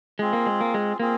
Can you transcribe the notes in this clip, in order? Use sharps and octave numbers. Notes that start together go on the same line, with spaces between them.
G#3 C4 F4 G#4
A#3
G#3
A#3
G#3
A#3 C4 F4 G#4